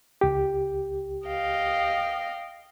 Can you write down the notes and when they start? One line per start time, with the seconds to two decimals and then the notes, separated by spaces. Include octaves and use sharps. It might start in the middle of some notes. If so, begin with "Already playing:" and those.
0.21 C#2 G4
1.26 D#5 F5 G5